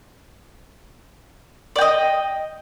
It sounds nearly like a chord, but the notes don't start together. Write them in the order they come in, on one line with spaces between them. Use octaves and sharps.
D5 G5 D#5